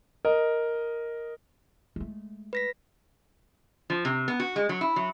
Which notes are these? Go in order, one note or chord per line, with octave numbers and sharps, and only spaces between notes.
A#4 D#5
G#3 A3
B4 A#6 B6
F3
C3
B3
F#4
G#3
F#3
E4
F#3